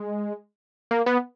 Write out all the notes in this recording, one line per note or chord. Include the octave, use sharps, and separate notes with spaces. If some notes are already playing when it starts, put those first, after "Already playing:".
Already playing: G#3
A#3
B3